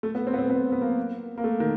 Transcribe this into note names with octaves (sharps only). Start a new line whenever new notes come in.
A3
B3
C4
B3
C4
B3
B3
A#3
A#3
A3
D#3